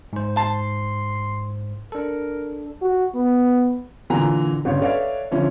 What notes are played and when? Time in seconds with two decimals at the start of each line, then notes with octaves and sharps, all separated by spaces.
0.13 G#2 C5
0.37 A5 C6
1.92 D4 A4 A#4
2.82 F#4
3.15 B3
4.10 A#2 D3 E3 G#5 A#5
4.65 G1 C#3 C#5
4.81 A4 B4 C#5 D5 E5 F5
5.31 D3 F3 C#4 E4